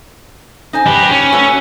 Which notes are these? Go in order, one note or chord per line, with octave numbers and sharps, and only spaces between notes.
D#4 C5 G#5
G4 B4
C#4
A3 B3 F#4